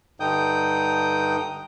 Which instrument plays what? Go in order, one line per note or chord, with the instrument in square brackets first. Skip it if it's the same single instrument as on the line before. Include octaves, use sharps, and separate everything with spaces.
[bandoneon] G2 D3 D#4 G5 D#6 G6